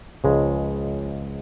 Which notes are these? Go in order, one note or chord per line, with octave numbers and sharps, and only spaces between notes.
C#2 C#3 F3 G#3